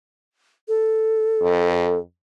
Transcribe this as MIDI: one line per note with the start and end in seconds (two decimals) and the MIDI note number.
0.68 1.99 69
1.41 2.01 41